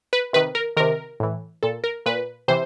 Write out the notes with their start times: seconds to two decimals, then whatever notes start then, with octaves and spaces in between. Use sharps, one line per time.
0.13 B4
0.33 C3 D#3 B4
0.55 A#4
0.77 C3 D#3 A#4
1.20 A2 E3
1.63 A#2 A4
1.84 A#4
2.06 A#2 B4
2.48 C3 E3 C5